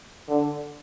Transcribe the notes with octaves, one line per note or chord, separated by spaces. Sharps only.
D3